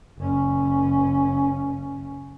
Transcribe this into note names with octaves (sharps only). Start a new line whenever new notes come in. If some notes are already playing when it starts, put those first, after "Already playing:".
F#1 C#4